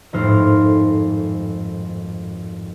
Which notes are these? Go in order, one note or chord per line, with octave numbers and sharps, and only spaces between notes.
G#1 F2 A2 D#4 C5 F6